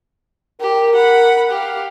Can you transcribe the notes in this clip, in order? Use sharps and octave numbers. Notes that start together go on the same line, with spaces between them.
G4 A#4
F#5 B5
G4 F5